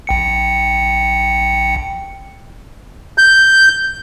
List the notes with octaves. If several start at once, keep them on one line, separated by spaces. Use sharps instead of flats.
A#1 G5 C#7
G6